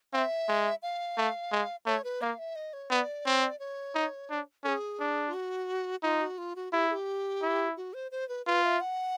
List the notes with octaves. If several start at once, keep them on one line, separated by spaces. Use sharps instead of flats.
C4 E5 F5
G#3
F5
A3
G#3
A3 C#5
B4
A#3 F5
E5
D#5
C#5
B3 D5
C4 C#5
D5
C#5
D#4
D4
C#4 G#4 A4
D4
F4
F#4
D#4 F4
F#4
F4
F#4
E4 G4
G#4
G4
E4
F#4
C5
C5
B4
F4 B4
E5
F#5